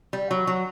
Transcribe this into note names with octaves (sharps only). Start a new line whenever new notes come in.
G3
F#3
F#3